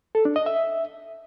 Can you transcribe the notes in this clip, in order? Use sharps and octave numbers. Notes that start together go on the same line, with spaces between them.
A4
D4
D#5
E5